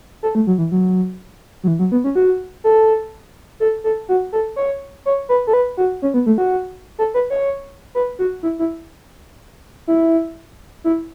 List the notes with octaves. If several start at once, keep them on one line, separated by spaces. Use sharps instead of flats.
A4
A3
F#3
E3
F#3
F#3
E3
F#3
B3
C#4
F#4
A4
A4
A4
F#4
A4
C#5
C#5
B4
A4
B4
F#4
C#4
B3
A3
F#4
A4
B4
C#5
B4
F#4
E4
E4
E4
E4